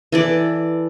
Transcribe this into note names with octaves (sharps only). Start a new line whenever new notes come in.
E3 A4 D5